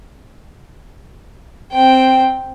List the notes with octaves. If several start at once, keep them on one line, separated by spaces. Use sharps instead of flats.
C4 G5